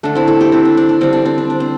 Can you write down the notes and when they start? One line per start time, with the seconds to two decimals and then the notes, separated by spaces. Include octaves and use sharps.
0.03 D3 A3 D4
0.15 C4 E4
0.27 E4 A4
0.40 D4 G4
0.52 C4 E4
0.65 D4
0.77 D4
0.89 D4
1.01 D3 G3 C4
1.13 D4
1.25 C4
1.38 D4
1.50 D4
1.60 C4